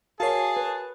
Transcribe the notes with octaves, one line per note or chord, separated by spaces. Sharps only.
F#4 G#4 A#4 C#5 F5 A5 C7
B4